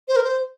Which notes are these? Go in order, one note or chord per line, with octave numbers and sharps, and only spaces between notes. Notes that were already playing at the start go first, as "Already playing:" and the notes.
C5
A#4
C5